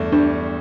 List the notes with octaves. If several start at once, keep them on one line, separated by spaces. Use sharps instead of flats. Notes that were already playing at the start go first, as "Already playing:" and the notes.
Already playing: E2 G2 A3
G3 D4